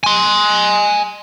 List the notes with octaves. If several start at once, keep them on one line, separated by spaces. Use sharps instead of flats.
G#5 C6